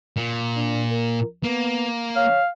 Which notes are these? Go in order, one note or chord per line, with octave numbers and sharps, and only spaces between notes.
A#2
D4
A#4
A#3 B3
C#5 F5